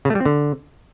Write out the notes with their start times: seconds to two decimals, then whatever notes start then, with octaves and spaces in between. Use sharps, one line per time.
0.05 C#3
0.10 A3
0.15 G3
0.20 C4
0.25 D3